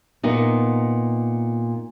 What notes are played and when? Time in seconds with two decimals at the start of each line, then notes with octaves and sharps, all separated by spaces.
0.23 A#2 B3 D#4